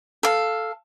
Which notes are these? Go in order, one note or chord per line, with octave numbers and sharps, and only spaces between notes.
A4 F5